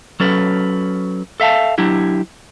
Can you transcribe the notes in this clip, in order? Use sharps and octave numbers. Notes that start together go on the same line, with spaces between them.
F#3 C#4 A4 B4
A4 E5 F5 A5
F#3 D4 E4 G4